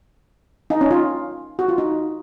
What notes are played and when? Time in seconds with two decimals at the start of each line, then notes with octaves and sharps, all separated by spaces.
0.70 D#4
0.81 C#4
0.91 F4
1.59 F#4
1.68 F4
1.78 D#4